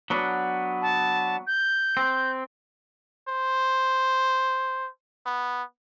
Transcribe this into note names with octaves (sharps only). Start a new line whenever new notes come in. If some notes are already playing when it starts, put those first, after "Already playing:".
F#3 B3 D4
A5
G6
C4
C5
B3